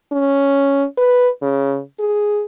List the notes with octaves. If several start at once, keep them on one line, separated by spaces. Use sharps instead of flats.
C#4
B4
C#3
G#4